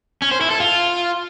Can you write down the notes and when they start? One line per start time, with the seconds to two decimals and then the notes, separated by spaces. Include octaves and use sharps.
0.22 C#4
0.31 C5
0.41 E4
0.51 A4
0.60 F4